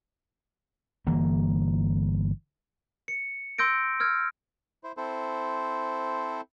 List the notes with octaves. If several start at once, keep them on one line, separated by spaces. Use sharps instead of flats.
G1 E3 A#3
C#7
C6 E6 G6 A#6 D7
E6 F6 G#6
E4 C5
C4 E4 A4 C5